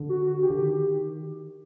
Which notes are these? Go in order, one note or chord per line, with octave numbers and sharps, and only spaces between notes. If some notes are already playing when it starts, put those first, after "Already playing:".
Already playing: D3
F#4
F#4
G4
D3
D#3